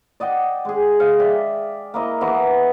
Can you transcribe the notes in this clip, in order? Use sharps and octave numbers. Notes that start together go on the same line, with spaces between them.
D5 D#5 F#5 G5
G#3 G#4
D#5 F5
D5 E5 G5
A#3 E4 D#5
E3 B3 D#5 C#6